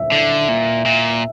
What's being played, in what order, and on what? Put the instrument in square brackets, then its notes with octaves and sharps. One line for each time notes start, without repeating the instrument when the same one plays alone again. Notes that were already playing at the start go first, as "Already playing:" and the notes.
Already playing: [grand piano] E5
[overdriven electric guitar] D3
A#2
A#2